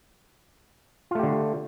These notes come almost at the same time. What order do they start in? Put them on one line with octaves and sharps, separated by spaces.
F4 A3 G4 D3